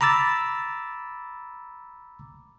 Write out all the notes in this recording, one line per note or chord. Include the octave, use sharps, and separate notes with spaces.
A#5 B5 D6 E6 A6